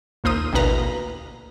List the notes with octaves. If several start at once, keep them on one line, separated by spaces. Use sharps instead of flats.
A#1 D#2 A#3 C5 A#5 D#6
A1 D2 B2 A#3 B4 A#5